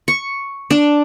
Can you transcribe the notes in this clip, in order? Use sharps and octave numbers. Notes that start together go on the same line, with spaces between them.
C#6
D4